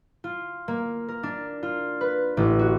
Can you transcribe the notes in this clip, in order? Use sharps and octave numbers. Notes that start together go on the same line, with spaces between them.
F4
A#3
A#4
D4
F4
B4
A1
F#4